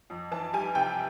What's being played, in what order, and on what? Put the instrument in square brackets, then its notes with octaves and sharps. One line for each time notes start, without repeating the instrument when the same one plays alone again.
[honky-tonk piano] F2
E3 A5
G3 G#5
C3 G5